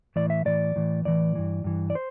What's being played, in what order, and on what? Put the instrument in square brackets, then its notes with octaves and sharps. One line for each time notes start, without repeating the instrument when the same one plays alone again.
[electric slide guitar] A2 E3 D5
E5
A2 E3 D5
A2 E3
A2 E3 D5
G2 E3
G2 E3
D5
C5